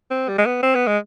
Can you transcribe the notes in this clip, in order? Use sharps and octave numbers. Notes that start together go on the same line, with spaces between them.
C4
G3
G#3
B3
C4
B3
G#3